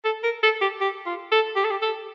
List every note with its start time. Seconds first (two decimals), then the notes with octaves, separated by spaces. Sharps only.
0.05 A4
0.23 A#4
0.43 A4
0.61 G4
0.81 G4
1.06 F4
1.32 A4
1.56 G4
1.64 A4
1.71 G4
1.82 A4